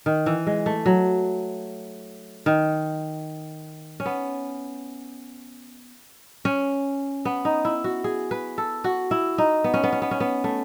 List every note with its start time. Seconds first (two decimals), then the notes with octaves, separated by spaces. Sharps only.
0.06 D#3
0.26 E3
0.47 G#3
0.66 A3
0.86 F#3
2.46 D#3
4.00 C#4
4.06 B3
6.45 C#4
7.25 B3
7.45 D#4
7.65 E4
7.84 F#4
8.04 G#4
8.31 B4
8.58 A4
8.84 F#4
9.11 E4
9.38 D#4
9.64 B3
9.74 C#4
9.83 B3
9.92 C#4
10.02 B3
10.11 C#4
10.20 B3
10.44 A3